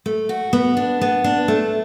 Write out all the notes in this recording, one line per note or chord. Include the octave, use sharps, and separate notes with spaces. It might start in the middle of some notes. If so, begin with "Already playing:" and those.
A3
F#4
B3
D4
B3
D4
A3